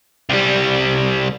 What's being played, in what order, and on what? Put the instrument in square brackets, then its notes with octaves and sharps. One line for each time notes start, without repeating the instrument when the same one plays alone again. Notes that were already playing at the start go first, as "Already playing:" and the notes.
[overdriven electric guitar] C2 G3